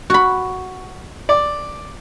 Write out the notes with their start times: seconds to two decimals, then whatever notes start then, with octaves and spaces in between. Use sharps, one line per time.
0.10 F#4 B5
1.29 D5